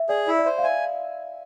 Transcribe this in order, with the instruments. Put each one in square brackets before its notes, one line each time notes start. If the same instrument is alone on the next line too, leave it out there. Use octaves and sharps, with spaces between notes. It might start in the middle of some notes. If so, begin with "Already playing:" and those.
Already playing: [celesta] E5
[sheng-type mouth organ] G#4 [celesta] D5
[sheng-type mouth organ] E4 [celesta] D5
[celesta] D5
[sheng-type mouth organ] C5 [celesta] E5
[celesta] F5
[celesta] E5 [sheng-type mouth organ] G#5